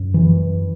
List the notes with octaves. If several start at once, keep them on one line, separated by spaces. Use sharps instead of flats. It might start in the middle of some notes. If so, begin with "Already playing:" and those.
Already playing: F#2
E3